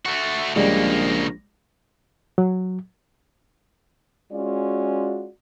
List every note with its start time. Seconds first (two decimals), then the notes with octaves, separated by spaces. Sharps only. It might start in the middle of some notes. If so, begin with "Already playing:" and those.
0.05 A3 F#4
0.56 A#1 C#3 G3 G#3 A#3
2.38 F#3
4.32 G#3 C#4 F4 F#4 D5